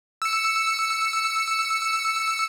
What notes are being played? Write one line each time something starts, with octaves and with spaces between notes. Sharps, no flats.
E6 C#7